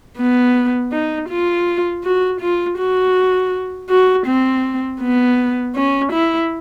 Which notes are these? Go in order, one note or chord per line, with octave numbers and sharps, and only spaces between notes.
B3
D#4
F4
F#4
F4
F#4
F#4
C4
B3
C#4
E4